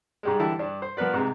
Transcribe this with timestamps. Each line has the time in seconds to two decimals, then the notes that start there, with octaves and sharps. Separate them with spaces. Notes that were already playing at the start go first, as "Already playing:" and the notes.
0.23 G#2 G3 G#3
0.39 D3 E3 E4 G4 A5
0.59 G2 D4 D5
0.82 C5
0.97 F3 B3 A#4 B4 D5
1.14 G#2 C3 G#3